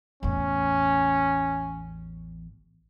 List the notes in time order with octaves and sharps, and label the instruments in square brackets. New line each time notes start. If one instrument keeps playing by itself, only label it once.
[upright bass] A1 E2 [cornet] C#4